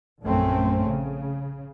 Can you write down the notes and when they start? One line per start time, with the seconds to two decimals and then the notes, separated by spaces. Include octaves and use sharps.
0.23 A#1 F#2 A3 C4 C#4
0.83 C#3